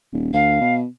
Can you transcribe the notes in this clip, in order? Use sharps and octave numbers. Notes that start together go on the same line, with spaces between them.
D#1
D2 F5
B2